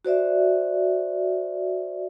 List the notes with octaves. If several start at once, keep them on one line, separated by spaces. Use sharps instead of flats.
F#4 C5 D5 E5